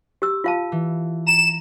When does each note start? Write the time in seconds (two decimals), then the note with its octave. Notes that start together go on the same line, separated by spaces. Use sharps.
0.22 G4 E6
0.44 F4 F5 A5
0.72 E3
1.26 A#5 E7